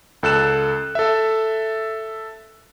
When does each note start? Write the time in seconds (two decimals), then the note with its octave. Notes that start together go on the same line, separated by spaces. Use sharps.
0.23 C#2 A4 F#6 E7
0.95 A4 E5